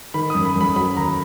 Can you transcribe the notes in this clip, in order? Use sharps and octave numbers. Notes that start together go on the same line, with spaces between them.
D#3 B5
F#2 D#6
B5
F#2 B5
F#3 B5
D#2 A#5